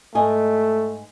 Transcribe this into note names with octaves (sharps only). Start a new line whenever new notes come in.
G#2 A3 D#5 G#5